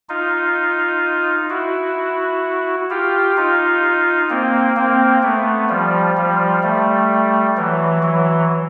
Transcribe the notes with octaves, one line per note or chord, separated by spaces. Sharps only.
D#4 F4
E4 F#4
F4 G4
D#4 F4
A#3 C4
A#3 C4
A3 B3
F3 G3
F3 G3
G3 A3
E3 F#3
E3 F#3